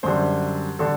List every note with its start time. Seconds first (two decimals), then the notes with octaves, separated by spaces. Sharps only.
0.03 F#2 D3 G3 C5
0.79 D3 G3 A4